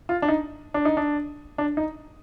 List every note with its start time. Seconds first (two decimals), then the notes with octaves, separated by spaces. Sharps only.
0.09 F4
0.22 D4
0.28 D#4
0.74 D4
0.85 D#4
0.97 D4
1.58 D4
1.77 D#4